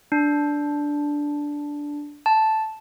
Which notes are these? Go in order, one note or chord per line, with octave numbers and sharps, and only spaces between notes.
D4
A5